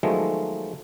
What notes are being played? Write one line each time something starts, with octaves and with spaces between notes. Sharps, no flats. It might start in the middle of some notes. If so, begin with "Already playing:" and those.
D#3 F3 F#3 G#3 A3 B3